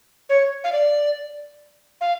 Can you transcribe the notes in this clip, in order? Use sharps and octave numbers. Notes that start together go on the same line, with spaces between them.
C#5
F5
D5
F5